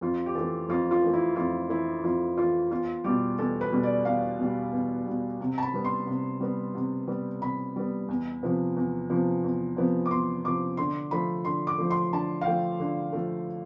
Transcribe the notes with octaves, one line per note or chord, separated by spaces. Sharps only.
F2 F4
G4
E3 A3 A4
F2 F4
F4
E3 A3
E4
F2 F4
E3 A3 E4
F2 F4
E3 A3 F4
E2 F4
B2 G3 G4
E2 A4
B4
B2 G3
D5
E2 F5
B2 G3
E2
B2 G3
C3
A5
B5
G3 B3
C6
C3
G3 B3
C3
G3 B3
C3 B5
G3 B3
E2
C3 F3 B3
E2
C3 F3 B3
E2
C3 F3 B3
D6
E2 C6
C3 F3 B3 D6
D3 C6
F3 A3 B5
D3 C6
D6
F3 A3
C6
D3 A5
F5
F3 A3 G5
D3
F3 A3